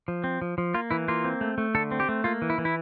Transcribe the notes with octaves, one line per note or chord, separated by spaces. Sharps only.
F3
C4
F3
F3
A#3 F4
E3 E4
A#3 F4
C4
A3
A3
D3 A4
C4
G4
A3
A#3 F4
E3
E4
E3
E4